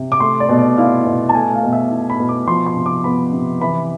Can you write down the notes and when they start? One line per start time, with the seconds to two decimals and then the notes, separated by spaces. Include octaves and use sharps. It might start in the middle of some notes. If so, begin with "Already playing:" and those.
Already playing: C3
0.12 D6
0.20 A3 C6
0.40 D5
0.49 B2
0.59 D5
0.77 E4 F5
1.07 B2
1.29 A5
1.34 A3 G#5
1.53 F5
1.63 B2
1.73 E5
1.90 E4
2.10 B5
2.20 B2
2.29 D6
2.47 F3 C6
2.66 C6
2.76 C3
2.86 D6
3.04 B3 B5
3.32 C3
3.61 E3 B5